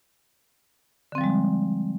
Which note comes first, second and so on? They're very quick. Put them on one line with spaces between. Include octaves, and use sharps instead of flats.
D3 C4 F3 G3 G#3